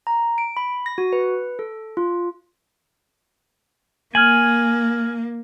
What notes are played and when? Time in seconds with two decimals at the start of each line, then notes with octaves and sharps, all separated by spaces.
0.07 A#5
0.38 D7
0.57 B5
0.86 A#6
0.98 F#4
1.13 B4
1.59 A4
1.97 F4
4.15 A#3 G#5 F6 G#6 F#7